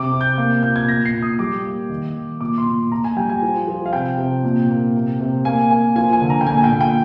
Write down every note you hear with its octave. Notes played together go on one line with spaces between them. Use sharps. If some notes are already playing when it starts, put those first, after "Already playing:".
Already playing: C3 D6
C3
G6
A#3
A#2 G6
G#6
A#2 A#6
C7
A#2
D#6
G3 D6
A#3
D#3
D#3
A#2 D6
C6
A#2
A#2 A#5
G#5
G3 G5
G#5
F3
F3
F5
C3 G5
C3
A#2
A#3
C3
C3
A#3 G#5
A#3 G#5
F3 G#5
G#5
D3
A#5
G5
A#2 G#5
G#5
G5
A#2
G5